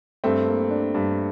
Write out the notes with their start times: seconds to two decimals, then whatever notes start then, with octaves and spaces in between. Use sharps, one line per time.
0.24 G2 A3 C4
0.47 A#3
0.71 D4
0.94 G2